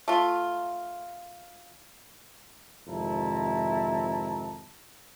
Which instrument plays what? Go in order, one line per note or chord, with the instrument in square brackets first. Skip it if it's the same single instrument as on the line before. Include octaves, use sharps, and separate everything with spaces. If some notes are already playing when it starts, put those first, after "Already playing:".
[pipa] A3 F4
[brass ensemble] G#1 F2 C3 E4 A5 A#5